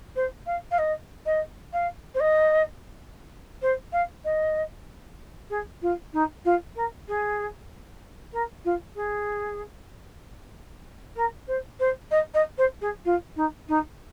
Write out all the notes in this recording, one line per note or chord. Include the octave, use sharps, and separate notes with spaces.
C5
F5
F5
D#5
D#5
F5
C5
D#5
C5
F5
D#5
G#4
F4
D#4
F4
A#4
G#4
A#4
F4
G#4
A#4
C5
C5
D#5
D#5
C5
G#4
F4
D#4
D#4